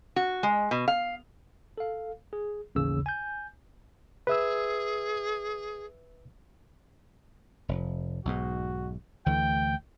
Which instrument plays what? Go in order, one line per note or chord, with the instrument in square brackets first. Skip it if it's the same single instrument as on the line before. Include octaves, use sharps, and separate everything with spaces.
[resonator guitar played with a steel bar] F#4
G#3
B2
F5
[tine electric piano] A4 F5
G#4
A1 D#2 C#3 E6
G#5 G6
[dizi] G#4 [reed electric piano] B4 E5 E6
[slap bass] F1
[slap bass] B1 G#2 [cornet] F#4
[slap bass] D2 E3 A3 [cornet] G5